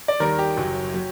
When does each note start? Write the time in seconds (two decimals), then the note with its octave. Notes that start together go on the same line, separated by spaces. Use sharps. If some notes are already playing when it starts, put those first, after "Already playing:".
0.08 D5
0.20 D#2 D#3 G3 A#4
0.39 G4
0.57 F#1 F#2 F#3
0.94 F#3